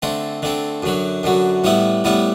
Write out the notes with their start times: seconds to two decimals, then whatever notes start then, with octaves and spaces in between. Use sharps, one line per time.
0.02 D3 A3 C4
0.42 D3 A3 C4
0.83 F#2 D3 F#3
1.23 F#2 D3 F#3
1.64 A2 G3 B3 E4
2.04 A2 G3 B3 E4